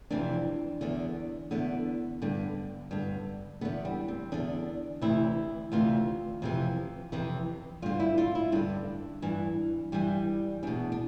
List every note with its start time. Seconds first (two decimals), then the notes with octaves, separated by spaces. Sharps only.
0.10 F2 C3 E3 D4
0.81 E2 D3
1.51 E2 D3 B3
2.22 G2 D3
2.91 G2 D3
3.61 E2 D3 B3
3.85 G3
4.08 C4
4.32 E2 D3 D4
5.02 D2 C3 E3 E4
5.72 D2 C3 E3 F4
6.42 F2 C3 E3
7.12 F2 C3 E3
7.82 G2 D3 F4
8.00 E4
8.18 F4
8.35 E4
8.52 G2 D3 D4
9.22 G2 E3
9.92 G2 E3 G3
10.63 E2 B2 D4
10.92 D4